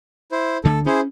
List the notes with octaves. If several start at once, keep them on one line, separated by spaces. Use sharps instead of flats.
E4 C5
D2 D3 A3 A4
C#4 E4 G#4 C5